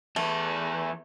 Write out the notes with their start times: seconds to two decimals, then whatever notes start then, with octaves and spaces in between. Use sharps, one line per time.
0.16 E2 A3 B4